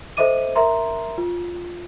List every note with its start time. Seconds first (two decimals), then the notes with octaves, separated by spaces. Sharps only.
0.17 A4 C5 D#5 E5 D6 D#7
0.55 A#4 E5 A#5 C6
1.18 F4